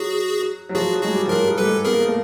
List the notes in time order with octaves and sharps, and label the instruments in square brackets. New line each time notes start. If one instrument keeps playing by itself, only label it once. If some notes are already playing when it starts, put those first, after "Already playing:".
Already playing: [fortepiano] F#3 [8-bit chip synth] F#4 G#4
[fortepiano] F#3
[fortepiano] F3 [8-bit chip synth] F#4 G#4
[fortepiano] F#3
[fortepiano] G#3 [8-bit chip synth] F#4 G#4
[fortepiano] G3
F3
[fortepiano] F#3 [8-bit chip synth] G#4 A#4
[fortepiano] G3
F#3
[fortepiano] G3 [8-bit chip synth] A4 B4
[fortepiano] G#3
[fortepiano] B3 [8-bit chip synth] G#4 A#4
[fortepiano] A#3
A3
A#3